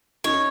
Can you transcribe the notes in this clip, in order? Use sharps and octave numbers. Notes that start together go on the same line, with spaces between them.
C#4 D#4 C#5